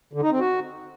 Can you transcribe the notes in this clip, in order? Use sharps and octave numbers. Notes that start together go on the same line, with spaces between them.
D3
D#4
C4
F#4